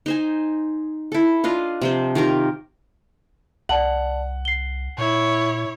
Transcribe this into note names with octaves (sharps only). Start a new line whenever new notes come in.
D#4 C5 G#5
E4 A4
D4 F4 D#5 F5
C3 F3 C5
D#3 F4 G4 A#4
C2 D5 F#5 A5 F#7
C7 G7
A#2 E4 C#5